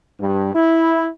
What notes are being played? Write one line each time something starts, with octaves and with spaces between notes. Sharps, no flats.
G2
E4